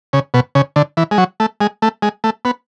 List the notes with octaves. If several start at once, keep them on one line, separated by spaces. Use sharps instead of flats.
C#3
B2
C#3
D3
E3
G#3
F#3
A3
G#3
A3
G#3
A3
B3